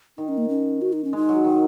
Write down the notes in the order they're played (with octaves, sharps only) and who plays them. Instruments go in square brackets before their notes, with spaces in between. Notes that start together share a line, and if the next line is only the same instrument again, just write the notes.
[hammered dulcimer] D#3 [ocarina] D#4
[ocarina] C#4
A#3
C#4
F#4
D#4
C#4
[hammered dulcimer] G#3 [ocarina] D#4
[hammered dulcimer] F#3
D#3